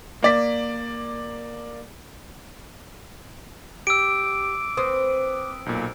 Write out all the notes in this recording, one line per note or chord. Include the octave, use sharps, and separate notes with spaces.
A#3 D5 B6
G4 D6 E6 D7
C4 B4 D#6
B1 A#2